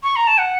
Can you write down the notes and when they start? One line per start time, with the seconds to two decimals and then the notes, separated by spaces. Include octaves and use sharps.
0.03 C#6
0.16 A#5
0.27 A5
0.39 F#5